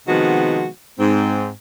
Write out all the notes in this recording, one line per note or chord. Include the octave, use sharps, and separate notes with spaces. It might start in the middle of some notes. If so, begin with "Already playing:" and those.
C3 D#3 F3 G#3 B3 F#4
G#2 C4